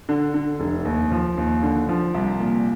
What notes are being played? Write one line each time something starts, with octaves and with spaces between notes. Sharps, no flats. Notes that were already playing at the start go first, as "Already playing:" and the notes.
D3
D3
F1
D#2
F3
D#2
D3
F3
C2
A#2